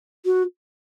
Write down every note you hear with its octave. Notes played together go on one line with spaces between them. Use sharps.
F#4